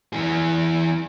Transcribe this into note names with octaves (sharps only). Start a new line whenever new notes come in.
E3 G#4